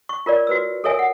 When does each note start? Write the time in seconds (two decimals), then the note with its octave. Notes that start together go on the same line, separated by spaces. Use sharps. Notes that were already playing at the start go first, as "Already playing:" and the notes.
0.09 C#6
0.26 F4 A#4 C#5 D5
0.47 F#4 B4 E6
0.84 A4 A#4 C#5 E5 G#5
0.99 F#5